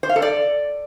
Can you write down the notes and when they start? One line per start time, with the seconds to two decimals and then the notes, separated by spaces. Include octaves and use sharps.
0.03 C5
0.09 F5
0.16 A4
0.22 D5